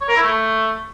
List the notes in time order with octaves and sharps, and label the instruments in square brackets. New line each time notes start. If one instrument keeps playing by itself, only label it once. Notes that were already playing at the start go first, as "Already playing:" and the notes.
[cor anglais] C#5
A#4
E4
A3